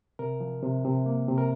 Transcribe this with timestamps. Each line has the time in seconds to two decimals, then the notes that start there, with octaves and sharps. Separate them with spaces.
0.19 C3 A#4
0.40 F3
0.62 C3
0.85 C3
1.06 A#3
1.28 C3
1.38 A#4